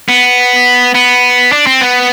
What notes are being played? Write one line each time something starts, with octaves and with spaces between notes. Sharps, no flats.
B3
B3
D4
C4
B3